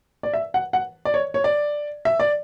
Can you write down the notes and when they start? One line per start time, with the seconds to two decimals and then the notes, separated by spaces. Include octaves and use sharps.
0.23 D5
0.33 E5
0.54 F#5
0.73 F#5
1.05 D5
1.14 C#5
1.34 C#5
1.44 D5
2.05 E5
2.20 D5